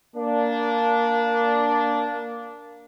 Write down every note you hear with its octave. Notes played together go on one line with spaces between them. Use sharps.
A#3 D4